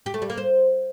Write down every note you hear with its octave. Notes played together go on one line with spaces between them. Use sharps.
G4
A3
G3
A#3
C5